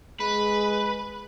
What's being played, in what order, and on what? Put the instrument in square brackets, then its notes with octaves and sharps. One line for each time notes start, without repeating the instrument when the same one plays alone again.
[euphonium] G#3 [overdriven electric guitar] B4